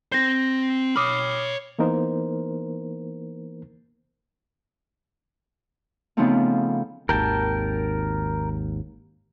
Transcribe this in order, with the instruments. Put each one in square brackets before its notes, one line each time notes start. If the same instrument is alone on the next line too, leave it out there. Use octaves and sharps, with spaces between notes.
[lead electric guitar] C4 C5 [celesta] G6 A#6
[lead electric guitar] C#5 B5 [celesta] D6 D#6 F6
[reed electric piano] E3 A#3 B3 D#4 A#4 C5
[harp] C#3 F3 A3 B3 C4 D#4
[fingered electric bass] G#1 D#2 [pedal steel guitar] A#4 G5 A5